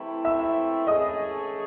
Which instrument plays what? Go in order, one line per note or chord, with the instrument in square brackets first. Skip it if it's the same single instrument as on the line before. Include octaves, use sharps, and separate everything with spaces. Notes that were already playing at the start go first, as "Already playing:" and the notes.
Already playing: [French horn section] C3 E3 A3 C4 E4
[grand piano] E5 E6
[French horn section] A3 C#4 G#4 [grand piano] D#5 D#6